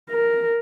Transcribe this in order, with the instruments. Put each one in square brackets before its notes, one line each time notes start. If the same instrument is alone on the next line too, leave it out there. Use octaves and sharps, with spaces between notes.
[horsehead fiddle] A#4